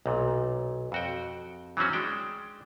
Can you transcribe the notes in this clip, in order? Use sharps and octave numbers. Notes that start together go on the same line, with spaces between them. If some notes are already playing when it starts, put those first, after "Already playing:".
B1 A#2
F2 F#4 G5
E3 F#3 C4 C#4 F#4
G#3 D4 G5